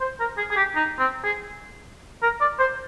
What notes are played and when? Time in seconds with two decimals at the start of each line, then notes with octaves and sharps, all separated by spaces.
0.01 C5
0.20 A#4
0.38 G#4
0.51 G#4
0.57 G4
0.76 D#4
0.99 C4
1.24 G#4
2.22 A#4
2.41 D5
2.59 C5